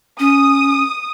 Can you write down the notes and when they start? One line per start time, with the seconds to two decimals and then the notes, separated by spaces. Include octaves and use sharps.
0.19 C#4 D#6